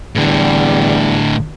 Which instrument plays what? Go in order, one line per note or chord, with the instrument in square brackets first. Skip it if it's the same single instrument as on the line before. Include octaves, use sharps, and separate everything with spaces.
[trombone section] E2 G3 [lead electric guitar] A2 D3